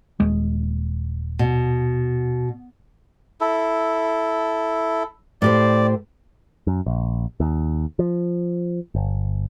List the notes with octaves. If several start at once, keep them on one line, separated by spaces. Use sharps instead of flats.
D#1 G#3
B2
E4 A4
A2 G4 C5 D5
F#2
A#1
D#2
F3
G1